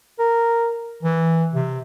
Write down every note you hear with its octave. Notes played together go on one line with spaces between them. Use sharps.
A#4
E3
C3